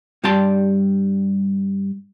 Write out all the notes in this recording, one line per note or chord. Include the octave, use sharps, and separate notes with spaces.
G2 G3 G4 D5 A5 C6